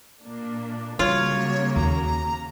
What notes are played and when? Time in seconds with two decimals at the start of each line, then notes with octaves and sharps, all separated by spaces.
0.23 A#2 A#3 D4
0.99 C#3 F#3 G3 A#3 F4 C#5
1.76 D#2 A#5